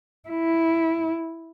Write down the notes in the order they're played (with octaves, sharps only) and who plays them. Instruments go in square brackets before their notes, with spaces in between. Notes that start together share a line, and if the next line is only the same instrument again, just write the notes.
[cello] E4